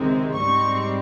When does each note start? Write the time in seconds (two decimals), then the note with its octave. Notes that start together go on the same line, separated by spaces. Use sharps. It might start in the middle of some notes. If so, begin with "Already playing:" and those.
Already playing: C#2 C3 D#3 G#3 C4
0.35 G#2 G3 C4 C#6